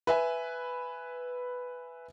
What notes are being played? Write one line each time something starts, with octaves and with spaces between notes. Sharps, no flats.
B4 E5 G#5